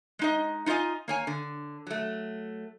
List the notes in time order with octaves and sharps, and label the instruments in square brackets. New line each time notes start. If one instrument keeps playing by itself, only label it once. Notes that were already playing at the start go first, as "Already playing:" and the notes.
[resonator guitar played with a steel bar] G#3 D#4 D#5
D#4 F4 C#5 D#5 G#5
A#3 C#5 G#5
D3
F#3 A3